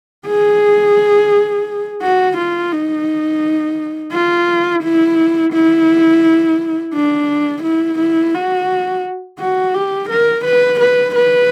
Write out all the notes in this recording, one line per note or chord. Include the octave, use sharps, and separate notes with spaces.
G#4
F#4
F4
D#4
F4
E4
E4
D4
E4
E4
F#4
F#4
G4
A#4
B4
B4
B4